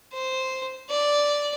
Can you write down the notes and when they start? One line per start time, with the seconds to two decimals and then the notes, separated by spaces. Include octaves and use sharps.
0.13 C5
0.90 D5